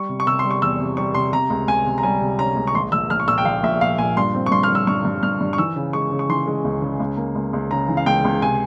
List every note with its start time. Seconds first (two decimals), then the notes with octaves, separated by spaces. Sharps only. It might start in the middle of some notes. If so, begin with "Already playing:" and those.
Already playing: G3 C#6
0.09 C3
0.20 C#6
0.27 C3 E6
0.39 C6
0.45 G3
0.51 C#6
0.62 E2 E6
0.80 C3
0.97 G3 C#6
1.14 C3 C6
1.33 C3 A#5
1.50 C#2
1.68 C#2 G#5
1.86 C3
1.98 A#5
2.03 G3 G#5
2.21 C3
2.39 C#4 A#5
2.56 C#2
2.67 C#6
2.75 A#1 C6
2.92 A#1 E6
3.10 A#1 F6
3.20 C#6
3.28 A#2 E6
3.38 G5
3.45 A#1 F5
3.63 A#1 E5
3.81 A#2 F5
3.98 A#2 G#5
4.17 G2 C6
4.35 C4
4.46 C#6
4.51 G2 C6
4.63 F6
4.69 G2
4.75 E6
4.87 G2 C#6
5.05 G2
5.23 G2 F6
5.40 G2
5.53 C#6
5.58 E3 E6
5.76 C#3
5.93 G#3 C#6
6.11 C#3
6.19 C#6
6.29 E3 C6
6.47 G#3
6.64 C#2
6.82 C#3
7.00 C#2
7.17 A#3
7.35 C#2
7.53 C#2
7.71 C#3 A#5
7.88 E3
7.97 F5
8.06 C#2 G5
8.25 C#2
8.42 C3 G#5